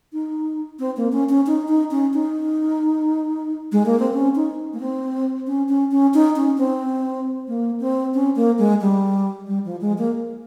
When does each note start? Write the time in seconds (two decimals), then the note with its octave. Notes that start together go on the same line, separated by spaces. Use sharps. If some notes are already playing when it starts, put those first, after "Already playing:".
0.13 D#4
0.79 C4
0.97 A#3
1.12 C#4
1.29 C#4
1.47 D#4
1.68 D#4
1.91 C#4
2.13 D#4
3.72 G#3
3.86 A#3
3.99 C4
4.13 C#4
4.35 D#4
4.73 A#3
4.80 C4
5.47 C#4
5.69 C#4
5.91 C#4
6.14 D#4
6.36 C#4
6.58 C4
7.48 A#3
7.80 C4
8.14 C#4
8.36 A#3
8.58 G#3
8.81 G3
9.47 G3
9.65 F3
9.81 G#3
9.98 A#3